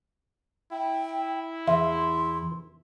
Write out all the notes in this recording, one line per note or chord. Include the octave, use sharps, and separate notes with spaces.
E4 G5
E2 E5 C6